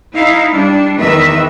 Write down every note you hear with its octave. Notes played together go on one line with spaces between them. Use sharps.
D#4 E4 F5
G3 D4
E2 D#3 B4 E5